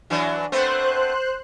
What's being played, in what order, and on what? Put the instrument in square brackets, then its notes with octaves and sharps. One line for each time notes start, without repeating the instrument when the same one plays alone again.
[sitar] E3 F#3 D4
[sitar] A3 B3 C4 [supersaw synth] C5 F#6